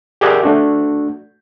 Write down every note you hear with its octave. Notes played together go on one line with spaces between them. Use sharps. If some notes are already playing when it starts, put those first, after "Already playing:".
G4 G#4 A#4 D5 E5 F#5
A3 D4 F#4